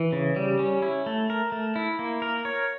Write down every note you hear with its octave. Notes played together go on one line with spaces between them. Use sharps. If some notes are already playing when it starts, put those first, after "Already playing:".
Already playing: E3
C#3
G3
C#4
E4
A3
A#4
A3
E4
A#3
A#4
C#5